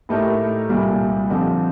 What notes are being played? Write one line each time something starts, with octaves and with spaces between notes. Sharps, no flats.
A2 A3 D#4 G4 A#4
C2 A#2 G3
D3 F3 C4 D#4 G4